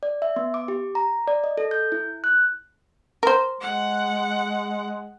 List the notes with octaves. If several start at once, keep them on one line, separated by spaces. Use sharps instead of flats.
D5
E5
B3
D6
G4
A#5
D5
D#5
A4
G6
E4
F#6
A#4 C5
G#3 F#5